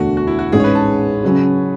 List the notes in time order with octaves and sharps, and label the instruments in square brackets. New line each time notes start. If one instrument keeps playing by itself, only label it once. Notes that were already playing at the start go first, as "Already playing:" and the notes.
Already playing: [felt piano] E1 D2 D3 A3 D4 [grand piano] F#4
[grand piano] F#4
E4
F#4
[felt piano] A1 G#2 G#3 C#4 [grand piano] G#4
[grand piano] C#5
B4
A5
[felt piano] C#3 F#3 C#4